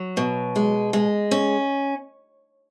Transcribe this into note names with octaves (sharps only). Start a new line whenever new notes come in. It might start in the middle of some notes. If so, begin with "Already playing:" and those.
Already playing: F#3
B2
G#3
G#3
C#4